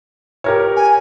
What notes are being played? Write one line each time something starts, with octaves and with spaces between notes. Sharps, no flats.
G4 A#4 C#5
G#5